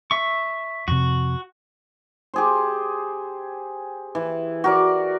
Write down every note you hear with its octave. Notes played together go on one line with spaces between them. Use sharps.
E5 C#6
F2 C3 F#4
G4 G#4 C5
E3
F#4 A#4 D5